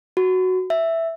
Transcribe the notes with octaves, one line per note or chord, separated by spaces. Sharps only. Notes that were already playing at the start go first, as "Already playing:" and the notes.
F#4
E5